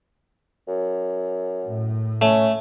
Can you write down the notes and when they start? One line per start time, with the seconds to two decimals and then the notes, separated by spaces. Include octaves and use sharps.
0.68 F#2
1.64 A2
2.22 A3 C#4